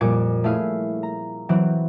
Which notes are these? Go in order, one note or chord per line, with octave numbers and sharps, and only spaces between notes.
F2 A#2 G3 D6 G#6 C#7
A3 C#4 E4 G#4 F5
A#5
E3 F#3 C4